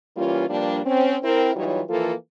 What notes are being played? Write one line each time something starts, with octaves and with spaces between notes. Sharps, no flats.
E3 G3 A#3 C#4 F4
G2 F3 G3 A#3 D4
C4 C#4
C4 E4 A#4
E3 F#3 G3 D#4 F4 C#5
E3 F3 A#3 F4 A4